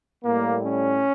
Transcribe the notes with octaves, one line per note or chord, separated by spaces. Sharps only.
A2 G3 A#3
C#4